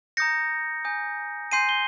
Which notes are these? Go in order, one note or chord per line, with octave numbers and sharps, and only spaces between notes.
A#5 D#6 G6 A#6 C#7
G#5 D#6 G6
G#5 C6 G6 C7 D#7
G7